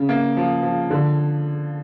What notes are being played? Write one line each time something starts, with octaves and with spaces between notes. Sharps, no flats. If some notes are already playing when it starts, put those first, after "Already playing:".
Already playing: C#3
A#3
F3
F3
D3